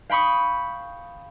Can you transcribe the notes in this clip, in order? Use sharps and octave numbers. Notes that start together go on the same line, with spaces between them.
F5 G5 B5 C#6 D#6